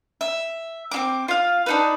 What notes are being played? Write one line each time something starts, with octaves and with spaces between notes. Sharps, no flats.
E5
C4 E4 D6
F4 F5
D4 D#4 B4